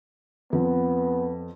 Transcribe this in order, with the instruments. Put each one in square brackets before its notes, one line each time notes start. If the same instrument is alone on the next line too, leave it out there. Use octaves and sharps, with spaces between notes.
[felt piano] F2 [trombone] B3